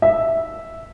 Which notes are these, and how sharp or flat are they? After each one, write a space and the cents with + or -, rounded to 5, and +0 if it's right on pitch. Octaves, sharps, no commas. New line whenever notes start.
E5 -5